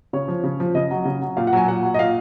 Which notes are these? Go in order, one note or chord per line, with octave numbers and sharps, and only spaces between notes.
C#3 C#5
F3
C#3
F3
C#3 D#5
F#3
C#3
F#3
A#2 F5
F#5
F#3 G#5
A#2 F#5
F#3
D#5
A#2 F5